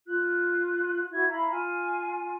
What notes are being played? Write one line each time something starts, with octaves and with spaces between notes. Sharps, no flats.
F4 F#6
E4 F#4 G#6
E4 F5 A#5 B5
F4 G#5